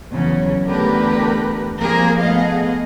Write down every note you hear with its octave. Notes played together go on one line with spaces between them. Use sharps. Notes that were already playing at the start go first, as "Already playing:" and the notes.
E2 C#3 F#3 C#4
E2 D3 A3 G4 A#4 B4
F3 G3 A#3 C4 G#4 A#4
A3 B3 G#4 D#5 F5